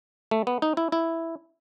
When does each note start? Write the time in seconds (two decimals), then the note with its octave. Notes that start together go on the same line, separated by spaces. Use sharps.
0.31 A3
0.47 B3
0.62 D#4
0.77 E4
0.92 E4